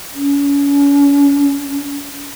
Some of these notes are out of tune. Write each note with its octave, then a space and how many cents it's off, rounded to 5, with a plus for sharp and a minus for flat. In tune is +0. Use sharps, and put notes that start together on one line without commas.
C#4 +35